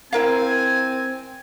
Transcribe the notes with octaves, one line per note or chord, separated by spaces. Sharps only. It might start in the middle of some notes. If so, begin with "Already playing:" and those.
C4 E4 A#4 F5 G#5